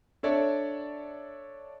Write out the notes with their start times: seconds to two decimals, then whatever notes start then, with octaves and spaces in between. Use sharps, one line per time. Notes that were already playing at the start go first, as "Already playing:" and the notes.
0.23 D4 A4 C#5 D5 E5